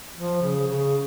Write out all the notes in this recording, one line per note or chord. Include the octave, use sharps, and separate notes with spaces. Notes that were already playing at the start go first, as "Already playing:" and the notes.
F3
C#3
C#3